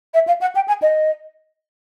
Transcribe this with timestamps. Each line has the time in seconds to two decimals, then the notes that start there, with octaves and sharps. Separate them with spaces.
0.14 E5
0.27 F5
0.41 F#5
0.55 G5
0.68 G#5
0.82 D#5